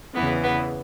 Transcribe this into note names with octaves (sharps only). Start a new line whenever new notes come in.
E2 C#3 E3 B3
B3